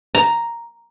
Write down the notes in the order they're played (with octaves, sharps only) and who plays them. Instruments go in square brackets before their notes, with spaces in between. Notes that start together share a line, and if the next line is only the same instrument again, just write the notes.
[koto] A#5